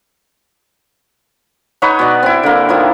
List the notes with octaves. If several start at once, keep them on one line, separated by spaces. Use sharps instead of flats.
D#4 B4 C#5 F#5
B2 D5
C4 E4
D3 A#3
D#3 F3 E4